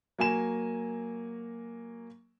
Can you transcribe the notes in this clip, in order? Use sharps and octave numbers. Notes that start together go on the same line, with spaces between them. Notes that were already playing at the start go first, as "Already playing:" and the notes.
F#3 A#3 G#5 E7